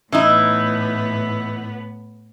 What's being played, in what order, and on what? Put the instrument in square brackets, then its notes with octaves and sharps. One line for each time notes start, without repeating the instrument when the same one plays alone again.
[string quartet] A2 B3 [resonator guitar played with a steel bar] E3 D#4 E4